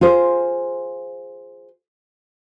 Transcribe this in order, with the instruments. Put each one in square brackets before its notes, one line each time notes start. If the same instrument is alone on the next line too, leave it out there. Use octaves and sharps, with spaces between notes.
[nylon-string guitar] F4 G#4 C5